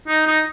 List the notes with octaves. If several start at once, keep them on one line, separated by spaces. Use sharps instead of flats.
D#4
D#4